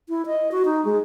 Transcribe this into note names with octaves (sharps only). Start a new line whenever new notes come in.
E4
D#5
F#4
D#4
G#3